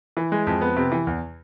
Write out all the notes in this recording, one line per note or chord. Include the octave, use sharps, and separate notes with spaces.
E3
G#3
F2
B3
C3
E3
E2